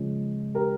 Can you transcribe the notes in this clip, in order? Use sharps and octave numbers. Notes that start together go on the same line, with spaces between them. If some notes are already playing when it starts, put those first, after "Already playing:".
Already playing: C#3 F3 G#3
G4 A#4